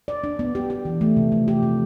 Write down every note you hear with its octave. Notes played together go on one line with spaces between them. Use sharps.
D5
D4
B3
G4
G4
E3
A3
C3
F3
G4
C3